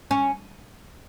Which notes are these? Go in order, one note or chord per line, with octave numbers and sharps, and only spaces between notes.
C#4